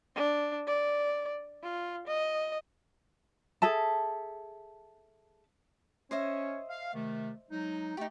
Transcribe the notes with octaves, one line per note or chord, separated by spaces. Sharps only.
D4
D5
F4
D#5
G#4 A4 E5 A5
C#4 C5 C#5 D#5 E5
F5
C3 D#3 A3
F#3 G#3 D#4
A3 D#4 G4